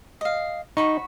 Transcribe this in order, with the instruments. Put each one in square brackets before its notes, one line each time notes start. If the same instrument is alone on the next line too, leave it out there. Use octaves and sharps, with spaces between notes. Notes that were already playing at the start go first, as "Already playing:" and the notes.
[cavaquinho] D#5 F5
[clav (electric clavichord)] D#4 [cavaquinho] F#4 B5 C#6